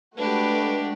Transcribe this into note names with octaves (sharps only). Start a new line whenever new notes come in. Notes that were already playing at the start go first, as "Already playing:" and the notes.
G#3 A3 D4 F#4 G4 B4